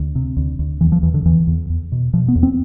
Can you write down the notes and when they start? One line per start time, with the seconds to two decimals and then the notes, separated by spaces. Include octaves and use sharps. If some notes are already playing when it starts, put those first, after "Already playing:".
Already playing: D2
0.15 C3
0.37 D2
0.59 D2
0.81 E2 E3
0.92 F3
1.03 E2 E3
1.14 D3
1.25 E2 E3
1.47 E2
1.70 E2
1.92 B2
2.13 B2 F3
2.28 B3
2.35 E2
2.43 C4